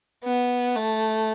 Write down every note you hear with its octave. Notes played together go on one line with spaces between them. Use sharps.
B3
A3